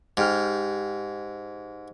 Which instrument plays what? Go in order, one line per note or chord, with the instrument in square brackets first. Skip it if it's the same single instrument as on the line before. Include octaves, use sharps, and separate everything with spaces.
[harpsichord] G#2 [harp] G4 G5 F6